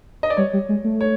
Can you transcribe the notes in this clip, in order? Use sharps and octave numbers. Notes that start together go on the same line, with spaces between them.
D#5
D5
G3 C#5
G3
G#3
A3
C#5